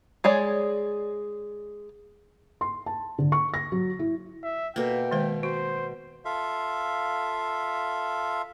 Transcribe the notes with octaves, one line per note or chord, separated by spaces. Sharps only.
G#3 G#4 C#5 D5
C6
A5
D3
C#6
A#6
F#3
E4
E5
B2 A#3 A4 G5
D#3 G#3 C5
F#4 C5
F4 A4 E5 F5